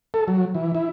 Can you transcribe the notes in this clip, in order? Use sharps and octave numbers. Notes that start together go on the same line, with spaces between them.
A4
F#3
E3
E4